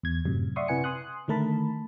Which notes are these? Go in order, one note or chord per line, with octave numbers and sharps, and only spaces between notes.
E2 G#6
F#2 A2 C3
D5 E5 F#5 C6 C#6 D#6
C3 E4 B4 F#5 G#5 C#7
G#5 C6 D#6 F#6
D3 D#3 A3 A#4 A5 B5